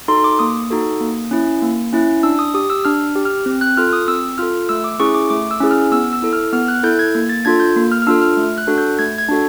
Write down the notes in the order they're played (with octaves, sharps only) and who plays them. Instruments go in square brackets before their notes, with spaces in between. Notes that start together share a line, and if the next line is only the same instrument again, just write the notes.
[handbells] D#4 F#4 A4 C6
D6
A#3 D#6
D#4 F#4 A4
A#3
C#4 E4
A#3
C#4 E4
D4 E6
D#6
G4 D#6
E6
D4 F6
G4
F6
C4
F#6
F4 A4 F6
D#6
C4 E6
F4 A4 F6
A3 E6
D6
C#4 E4 G#4 C#6
D6
A3 D6
E6
C#4 E4 G#4
F6
B3 E6
E6
E4 A4
F6
B3 F6
F#6
E4 A4 G6
G#6
A#3
A6
D4 F4 A4 G#6
G6
A#3
F6
F6
D4 F4 A4 E6
F6
A3
F#6
D4 F#4 A4
G6
A3 G#6
G#6
D4 F#4 A4